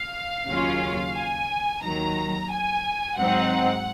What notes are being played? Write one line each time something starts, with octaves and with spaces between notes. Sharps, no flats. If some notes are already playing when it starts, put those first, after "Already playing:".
Already playing: F5
D#2 C#3 F#3 C#4 F4
G#5
D#2 D#3 F#3 A#5
G#5
G#1 G#2 F#3 C4 D#4 F#5